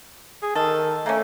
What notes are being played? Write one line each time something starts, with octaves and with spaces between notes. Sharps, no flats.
G#4
D#3 A4
A3 A#3 C#4